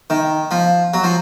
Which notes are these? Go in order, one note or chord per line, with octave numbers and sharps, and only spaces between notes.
D#3
F3
F#3
F3